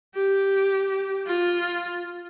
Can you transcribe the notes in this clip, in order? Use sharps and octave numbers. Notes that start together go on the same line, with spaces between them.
G4
F4